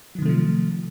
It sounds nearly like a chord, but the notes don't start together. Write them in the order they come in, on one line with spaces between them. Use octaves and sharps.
F#3 D#3 C3 A3 F3